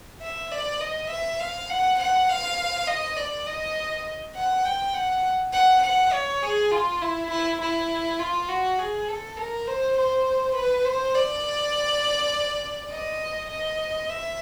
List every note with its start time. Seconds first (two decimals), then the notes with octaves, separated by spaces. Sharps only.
0.22 E5
0.52 D5
0.81 D#5
1.10 E5
1.39 F5
1.70 F#5
2.00 F#5
2.29 F5
2.87 D#5
3.17 D5
3.47 D#5
4.36 F#5
4.65 G5
4.94 F#5
5.53 F#5
5.83 F#5
6.13 C#5
6.43 G#4
6.71 F4
7.02 E4
7.31 E4
7.61 E4
8.20 F4
8.49 F#4
8.79 G#4
9.08 A4
9.37 A#4
9.67 C5
9.97 C5
10.55 B4
10.85 C5
11.15 D5
12.92 D#5
13.50 D#5
14.09 E5